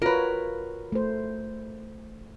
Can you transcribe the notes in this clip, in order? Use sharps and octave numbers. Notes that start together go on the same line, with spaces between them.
F4 F#4 A#4 B4 C#5
A3 C5